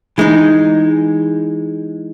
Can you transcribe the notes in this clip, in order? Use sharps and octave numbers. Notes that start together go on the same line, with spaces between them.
E3 G#3 D#4